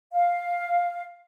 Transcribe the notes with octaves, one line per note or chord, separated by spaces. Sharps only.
F5